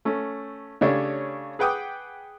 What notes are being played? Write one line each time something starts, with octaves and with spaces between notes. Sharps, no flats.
A3 C#4
C#3 A3 D4 G4 C#5
G#4 B4 F#5 G5 D6 D#6